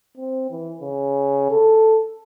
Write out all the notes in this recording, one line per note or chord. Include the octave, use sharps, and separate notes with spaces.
C4
E3
C#3
A4